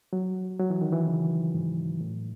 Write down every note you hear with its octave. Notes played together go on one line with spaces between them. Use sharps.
F#3
F#3
E3
D#3
E3
C#3
G#2
A2